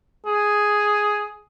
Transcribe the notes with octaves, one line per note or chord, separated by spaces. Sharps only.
G#4